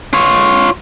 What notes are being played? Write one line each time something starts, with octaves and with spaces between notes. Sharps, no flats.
F4 C#5